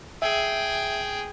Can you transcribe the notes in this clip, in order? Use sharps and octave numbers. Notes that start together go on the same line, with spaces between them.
G#4 E5 G5